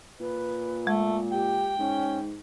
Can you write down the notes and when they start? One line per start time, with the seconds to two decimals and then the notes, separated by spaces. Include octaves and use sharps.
0.20 A#2 B4
0.87 G#3 A3
1.32 G4 G5
1.79 G#2 C#4